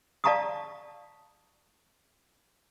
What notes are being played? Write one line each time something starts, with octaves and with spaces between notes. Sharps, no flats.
D5 F5 A5 A#5 C#6 D#6